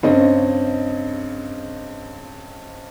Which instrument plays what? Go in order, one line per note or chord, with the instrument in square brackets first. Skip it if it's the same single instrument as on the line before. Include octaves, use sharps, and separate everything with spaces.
[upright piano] G2 C#3 C4 C#4 D#5